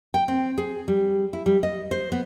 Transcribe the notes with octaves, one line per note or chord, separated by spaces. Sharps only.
G5
C4
G#4
G3
E4
G3
D#5
C5
B3